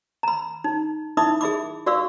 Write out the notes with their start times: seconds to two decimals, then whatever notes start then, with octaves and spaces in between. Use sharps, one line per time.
0.23 A#5 B5
0.64 D#4
1.17 D#4 E4 E5 B5 D6 D#6
1.41 G#4 E5 B5 D6
1.86 F#4 B4 D5 F5 C#6 E6